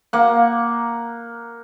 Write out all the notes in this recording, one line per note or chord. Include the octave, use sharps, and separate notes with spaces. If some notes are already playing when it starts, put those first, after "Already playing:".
A#3 F#5